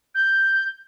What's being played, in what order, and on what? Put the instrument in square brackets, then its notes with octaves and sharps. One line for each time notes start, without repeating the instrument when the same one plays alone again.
[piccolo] G6